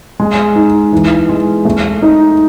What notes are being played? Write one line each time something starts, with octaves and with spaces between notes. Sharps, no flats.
G#3
D#4
E3
G#3
A3
D#4